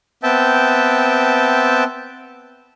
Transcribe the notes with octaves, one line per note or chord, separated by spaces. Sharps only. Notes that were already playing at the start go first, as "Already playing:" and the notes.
B3 C4 E5 G5 A5